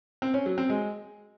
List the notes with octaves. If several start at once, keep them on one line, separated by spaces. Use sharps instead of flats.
C4
C#4
F#3
C4
G#3